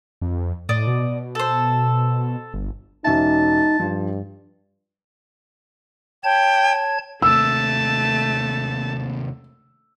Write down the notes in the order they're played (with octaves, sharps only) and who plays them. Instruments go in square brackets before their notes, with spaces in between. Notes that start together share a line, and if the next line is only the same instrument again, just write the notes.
[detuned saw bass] F2
[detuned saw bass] A2 [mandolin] D5 D#5
[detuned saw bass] B2
[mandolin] A4 C5
[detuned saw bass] G1
[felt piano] E1 C#4 E5 [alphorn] D#4 [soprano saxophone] A5
[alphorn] G2 [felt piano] F3
[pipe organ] C#5 A5 G#6 [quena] G5
[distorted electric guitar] D#2 C3 [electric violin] A3 A5 [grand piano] E6